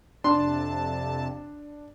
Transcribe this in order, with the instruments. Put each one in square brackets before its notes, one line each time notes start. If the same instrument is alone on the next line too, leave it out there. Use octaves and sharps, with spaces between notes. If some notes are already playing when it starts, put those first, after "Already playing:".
[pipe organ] F2 C3 A5 [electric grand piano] D4 [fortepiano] C6